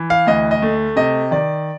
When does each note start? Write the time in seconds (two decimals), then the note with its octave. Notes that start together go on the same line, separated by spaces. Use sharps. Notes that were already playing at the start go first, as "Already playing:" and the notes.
Already playing: E3
0.10 F5
0.27 D2 D#5
0.51 D#5
0.62 A3
0.96 C3 D#5
1.31 D#3 D5